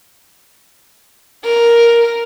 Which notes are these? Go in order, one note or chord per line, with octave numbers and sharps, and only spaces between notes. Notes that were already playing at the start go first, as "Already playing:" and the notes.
A#4